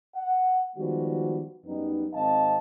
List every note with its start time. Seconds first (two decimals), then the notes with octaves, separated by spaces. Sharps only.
0.15 F#5
0.76 D#3 F3 G3 G#3 B3 F#4
1.66 F#2 G3 B3 D#4
2.14 G#1 C4 D#5 F5 A5